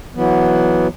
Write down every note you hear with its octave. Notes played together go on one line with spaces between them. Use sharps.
E3 F#3 B3